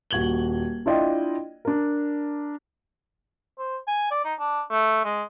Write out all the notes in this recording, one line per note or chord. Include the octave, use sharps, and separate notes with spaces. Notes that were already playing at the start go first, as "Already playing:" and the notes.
D#1 F#4 G#6 F#7 G7
D4 E4 F4 D5 D#5 G5
D4 A#4
C5
G#5
D5
D#4
D4
A3
G#3